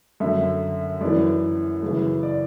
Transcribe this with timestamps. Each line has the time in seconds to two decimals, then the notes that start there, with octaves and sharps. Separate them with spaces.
0.20 F#2 D3 E5
1.01 F#2 E3 D5
1.83 F#2 C#3 E3
2.23 D5